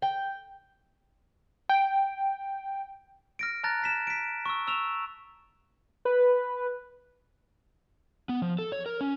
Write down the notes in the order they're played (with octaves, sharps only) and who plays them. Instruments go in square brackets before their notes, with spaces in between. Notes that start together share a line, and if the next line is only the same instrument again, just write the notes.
[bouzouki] G5
[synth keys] G5
[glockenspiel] F6 A#6 D7
A5 A#5 F6 F#6 A6 A#6
A6 B6 E7
B6 D7
C#6 E6
C#6 E6 E7 F7
[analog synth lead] B4
[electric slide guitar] B3
F3
A4
C#5
A#4
C#4